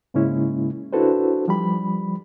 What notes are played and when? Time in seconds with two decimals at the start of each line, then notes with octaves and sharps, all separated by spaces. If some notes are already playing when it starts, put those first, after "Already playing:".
0.14 G#2 C#3 G#3 A#3 C#4 E4
0.93 D4 E4 F#4 A4 B4 C5
1.48 F3 G3 B5